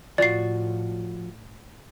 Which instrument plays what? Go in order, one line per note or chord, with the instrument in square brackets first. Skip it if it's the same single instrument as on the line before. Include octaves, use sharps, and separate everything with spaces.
[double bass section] A2 [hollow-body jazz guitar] F3 F4 F#4 [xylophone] D5 C7